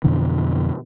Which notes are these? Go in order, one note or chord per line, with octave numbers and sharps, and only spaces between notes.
F2 B2 D3 E3